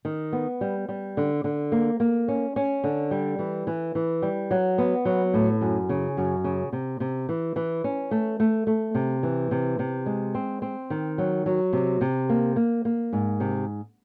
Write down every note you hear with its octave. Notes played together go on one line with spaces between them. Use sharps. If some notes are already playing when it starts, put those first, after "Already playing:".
D#3
B3
G3
G3
D3
D3
A#3
A#3
C#4
C#4
D3
G3
E3
E3
E3
G3
F#3
B3
F#3
A2
F#2
C#3
F#2
C#3
C3
C3
E3
E3
C#4
A3
A3
A3
C3
E3
C3
C3
G#3
C4
C4
D#3
F#3
F#3
C3
C3
A#3
A#3
A#3
G#2
C3